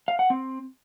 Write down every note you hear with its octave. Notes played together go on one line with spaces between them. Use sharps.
F5
F#5
C4